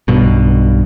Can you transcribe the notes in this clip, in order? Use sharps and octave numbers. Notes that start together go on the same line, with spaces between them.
B1 G2 B2